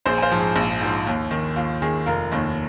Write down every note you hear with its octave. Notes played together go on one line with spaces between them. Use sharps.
A#1 G#4 C5
G#5
C5 F5
G#2 F3
G#4
A#1
G#2 F3
D#2
D#3
D#2 F4
D#3 G#4
F1 F4 A#4
D#2 D#3